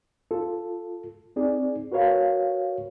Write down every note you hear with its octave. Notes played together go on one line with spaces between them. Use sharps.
F4 A4
C4 D#4 G#4 D5
F#4 A#4 B4 C#5 F5